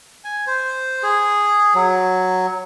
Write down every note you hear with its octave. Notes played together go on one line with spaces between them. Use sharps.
G#5
C5
G#4
F#3